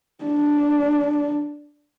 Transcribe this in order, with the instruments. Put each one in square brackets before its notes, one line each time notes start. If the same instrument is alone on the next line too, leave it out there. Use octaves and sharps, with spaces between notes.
[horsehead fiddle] D4